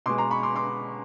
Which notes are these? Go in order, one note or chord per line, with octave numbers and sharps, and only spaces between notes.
B2 G#3 C6 D6
A#5 C6
B5 C#6
C6 D6
C6 D6